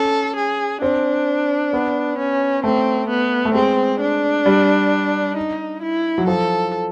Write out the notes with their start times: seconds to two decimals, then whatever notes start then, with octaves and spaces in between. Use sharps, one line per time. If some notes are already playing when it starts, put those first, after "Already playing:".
Already playing: C#4 A4
0.36 G#4
0.81 C4 D4
1.73 B3
2.18 C#4
2.64 A3 C4
3.09 B3
3.45 A3
3.54 G#3 C4
4.00 D4
4.46 G3
5.37 D#4
5.82 E4
6.18 F#3
6.27 F3 A4